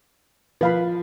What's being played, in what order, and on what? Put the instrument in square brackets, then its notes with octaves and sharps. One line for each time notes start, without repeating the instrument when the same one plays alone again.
[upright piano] F3 [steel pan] B4 F5 B5